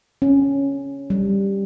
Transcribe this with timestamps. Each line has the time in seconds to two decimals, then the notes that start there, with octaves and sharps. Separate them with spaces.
0.22 C#4
1.10 G3